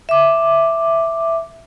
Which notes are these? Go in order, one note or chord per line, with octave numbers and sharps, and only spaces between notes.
E5 D6